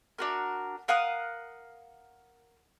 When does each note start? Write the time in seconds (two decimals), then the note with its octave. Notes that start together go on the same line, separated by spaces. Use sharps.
0.18 D4 F#4 A#4
0.88 A#4 F5 F#5 D#6